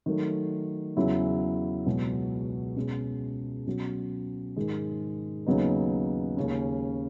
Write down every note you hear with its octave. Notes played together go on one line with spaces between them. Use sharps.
D#3 F#3 A3
E2 C#3 F#3 C#4 E4
C#2 B2 F#3
B2 G#3 C#4
B2 F#3 C#4 F#4
G#2 D#3 G#3
D#2 C#3 F#3 B3 D#4
D#2 C#3 G#3 C#4